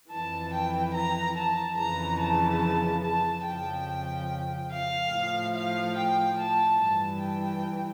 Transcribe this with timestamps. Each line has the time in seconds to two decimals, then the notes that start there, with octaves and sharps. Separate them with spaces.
0.11 F2 E3 A5
0.54 G5
0.94 A#5
1.37 A5
1.78 F2 C#3 E3 A#5
2.21 A5
3.04 A5
3.45 F2 C#3 F3 G5
4.70 F5
5.13 A2 F3
5.55 F5
5.96 G5
6.38 A5
6.79 G2 E3 A5
7.22 G5